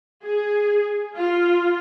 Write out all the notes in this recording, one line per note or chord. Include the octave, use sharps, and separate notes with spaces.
G#4
F4